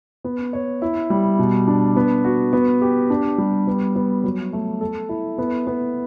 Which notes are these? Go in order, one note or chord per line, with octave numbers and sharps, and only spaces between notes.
B3
C#5
E4
G3
B2
D4
B3
F#4
B3
G4
D4
G3
B3
B3
F#3
A3
A4
E4
B3
B3